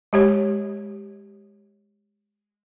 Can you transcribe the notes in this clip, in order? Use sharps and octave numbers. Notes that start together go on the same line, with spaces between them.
G#3 G4 C#5